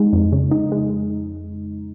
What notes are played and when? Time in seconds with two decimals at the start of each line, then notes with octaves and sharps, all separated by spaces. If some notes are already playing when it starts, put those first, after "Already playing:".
Already playing: G#3 D#4
0.13 F2
0.32 C#3
0.51 D#4
0.72 G#3